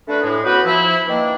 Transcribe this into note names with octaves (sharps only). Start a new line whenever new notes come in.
D3 A3 D4 F#4 B4
A2 G#3
B3 C#4 F#4 G4 B4
F3 E4
D#3 E3 A#3 D4